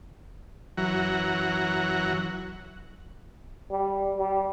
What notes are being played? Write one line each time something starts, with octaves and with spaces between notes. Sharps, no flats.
F#2 E3 F#3 F#5 A#5
G3
G3